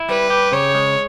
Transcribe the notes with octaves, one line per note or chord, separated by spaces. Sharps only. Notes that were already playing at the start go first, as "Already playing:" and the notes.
Already playing: E4
G3 B4
G4
C#3 C#5
G#3